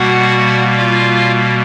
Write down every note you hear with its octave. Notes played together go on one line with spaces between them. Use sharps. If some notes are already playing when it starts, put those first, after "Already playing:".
Already playing: B2 G3 A#3 F#4 F#5
F4 F5